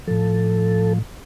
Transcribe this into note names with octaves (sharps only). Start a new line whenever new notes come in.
A2 F3 A4